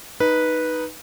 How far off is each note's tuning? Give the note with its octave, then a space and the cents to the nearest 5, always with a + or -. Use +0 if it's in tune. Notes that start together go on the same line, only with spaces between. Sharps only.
D#4 +0 B4 -10